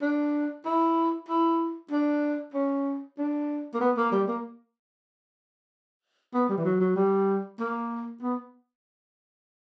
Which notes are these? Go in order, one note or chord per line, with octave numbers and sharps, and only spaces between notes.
D4
E4
E4
D4
C#4
D4
A#3
B3
A#3
G3
A#3
B3
G3
E3
F#3
F#3
G3
A#3
B3